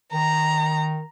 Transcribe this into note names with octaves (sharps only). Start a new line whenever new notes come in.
D#3 A#5